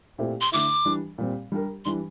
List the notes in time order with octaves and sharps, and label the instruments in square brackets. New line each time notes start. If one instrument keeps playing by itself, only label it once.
[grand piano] A#2 A3 C4 E4 G4
[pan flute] C6
[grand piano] D3 A3 E4 [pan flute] D6
[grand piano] E3 G3 D4
A#2 G3 C4
G3 D4 G4 A#4
[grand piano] E3 G3 D4 [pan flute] C6